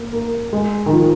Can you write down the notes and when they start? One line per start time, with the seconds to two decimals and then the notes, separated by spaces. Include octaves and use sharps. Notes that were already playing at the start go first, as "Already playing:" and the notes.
Already playing: A#3
0.13 A#3
0.53 G#3
0.86 D#3
0.93 F3